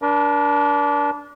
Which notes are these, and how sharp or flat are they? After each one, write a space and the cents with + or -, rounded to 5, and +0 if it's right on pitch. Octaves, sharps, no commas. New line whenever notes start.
D4 -20 A#4 +35